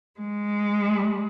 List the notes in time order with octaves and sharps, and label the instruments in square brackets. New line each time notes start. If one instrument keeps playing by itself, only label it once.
[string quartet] G#3